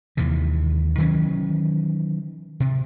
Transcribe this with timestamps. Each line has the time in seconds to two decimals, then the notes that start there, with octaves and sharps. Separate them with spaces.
0.17 D#2 C3 D#3 E3
0.98 D#3 E3 F#3 C#4
2.60 C3